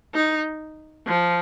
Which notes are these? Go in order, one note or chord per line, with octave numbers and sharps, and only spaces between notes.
D#4
F3